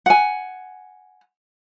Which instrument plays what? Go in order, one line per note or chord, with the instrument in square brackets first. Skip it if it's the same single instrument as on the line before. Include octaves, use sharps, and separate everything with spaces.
[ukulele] F#5 G#5